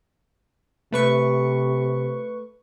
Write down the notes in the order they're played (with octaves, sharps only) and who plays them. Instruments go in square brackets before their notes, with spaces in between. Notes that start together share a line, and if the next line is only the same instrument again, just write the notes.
[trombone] C3 [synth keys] A3 B4 C#6